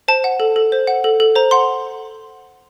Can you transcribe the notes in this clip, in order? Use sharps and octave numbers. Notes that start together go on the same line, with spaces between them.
C5 A5
F#5
A4
A4
C5
F#5
A4
A4
C5 A#5
F#5 C6